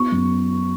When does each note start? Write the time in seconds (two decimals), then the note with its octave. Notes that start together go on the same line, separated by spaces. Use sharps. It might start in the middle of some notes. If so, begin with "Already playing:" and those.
Already playing: B3 C#6
0.12 F#2